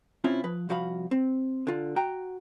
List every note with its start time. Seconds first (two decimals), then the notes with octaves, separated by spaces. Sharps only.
0.24 C3 C4 C#4 E4 F4
0.44 F3 B4
0.69 C2 F3 F#4 F5 B5
1.11 C4
1.67 D3 F4
1.96 F#4 G5 A#5